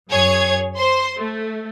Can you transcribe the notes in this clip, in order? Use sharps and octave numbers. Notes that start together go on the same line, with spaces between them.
F#2 G#4 C#5 G#6
C5 C6
A3